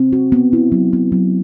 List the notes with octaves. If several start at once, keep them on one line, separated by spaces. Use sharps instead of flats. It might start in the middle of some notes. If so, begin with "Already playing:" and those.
Already playing: C4
F#4
B3
E4
F#3
B3
F#3